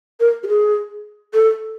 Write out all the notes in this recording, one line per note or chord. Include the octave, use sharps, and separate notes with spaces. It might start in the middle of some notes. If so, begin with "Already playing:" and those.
A#4
G4
G#4
A4